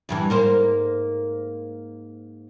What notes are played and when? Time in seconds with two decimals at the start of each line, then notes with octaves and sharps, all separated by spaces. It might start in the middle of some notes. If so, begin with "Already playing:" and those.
0.09 E2 G2 E3
0.30 G#2 A#3 C5